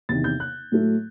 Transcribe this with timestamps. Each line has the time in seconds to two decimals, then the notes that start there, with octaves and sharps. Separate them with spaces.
0.09 E2 C3 D#3 A6
0.24 G6
0.40 F#6
0.71 A2 F#3 A3